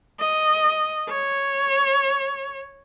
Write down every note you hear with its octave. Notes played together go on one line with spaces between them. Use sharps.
D#5
C#5